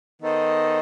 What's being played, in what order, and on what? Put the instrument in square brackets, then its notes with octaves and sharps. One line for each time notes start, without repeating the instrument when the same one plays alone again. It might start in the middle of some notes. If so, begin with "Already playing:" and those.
[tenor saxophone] D#3 [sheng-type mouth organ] B3 D#4 A4 C5 D#5